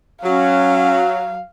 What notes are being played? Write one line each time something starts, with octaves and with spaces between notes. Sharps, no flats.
F#3 C#4 F5